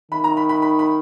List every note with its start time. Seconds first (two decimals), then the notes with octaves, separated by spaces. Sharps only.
0.12 D#3 B5
0.24 A#5
0.37 B5
0.49 B5
0.62 B5
0.79 B5